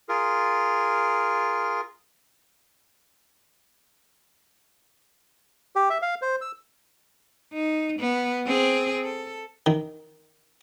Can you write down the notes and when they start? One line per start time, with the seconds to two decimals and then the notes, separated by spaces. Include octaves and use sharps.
0.09 F4 G#4 A#4
5.76 G4
5.90 E5
6.02 F5
6.22 C5
6.41 E6
7.53 D#4
7.99 B3
8.46 C4 G#4
9.04 A4
9.66 D#3